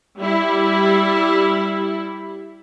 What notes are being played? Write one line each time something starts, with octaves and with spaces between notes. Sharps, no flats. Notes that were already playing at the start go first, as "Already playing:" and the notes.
G3 E4